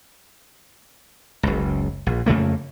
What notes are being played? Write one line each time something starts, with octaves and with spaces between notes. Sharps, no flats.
F#1 C#2
A#1
F2 C#3 A3 A#3